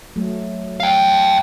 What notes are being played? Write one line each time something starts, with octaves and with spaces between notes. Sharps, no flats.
F#3 A3
F5 G5